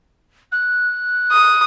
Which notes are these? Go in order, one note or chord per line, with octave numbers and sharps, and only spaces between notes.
F#6
D#6